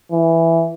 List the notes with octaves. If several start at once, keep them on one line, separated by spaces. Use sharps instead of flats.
E3